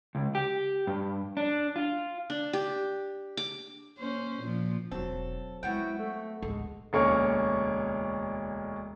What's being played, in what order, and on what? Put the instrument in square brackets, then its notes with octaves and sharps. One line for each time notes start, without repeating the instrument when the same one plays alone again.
[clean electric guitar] C#2
G4
G2
D4
F4
[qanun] D4
G4
D6
[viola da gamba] A#3 C#4 C5
A#2 F3
[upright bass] E1 D#4 [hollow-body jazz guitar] F#3 C4 [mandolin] A4
[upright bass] G#3 D#4 [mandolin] B3 F#4 G5 [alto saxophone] E4
[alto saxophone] A3
[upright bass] A1 D2 [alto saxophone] G#3 [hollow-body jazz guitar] A4
[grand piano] E1 D2 A#3 C#4 C#6